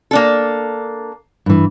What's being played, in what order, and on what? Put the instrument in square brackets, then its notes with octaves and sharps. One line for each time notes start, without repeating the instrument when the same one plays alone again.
[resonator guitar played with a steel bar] A#3 D4 A4
[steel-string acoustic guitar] G2 E3